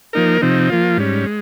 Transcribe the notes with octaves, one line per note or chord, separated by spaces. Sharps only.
F3 A#3 D#4 A#4
C3 F3 C4 D#4
F3 A#3 F4
G#2 G3 C#4
G#3